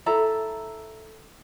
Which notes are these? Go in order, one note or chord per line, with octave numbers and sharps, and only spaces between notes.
E4 A4 A#5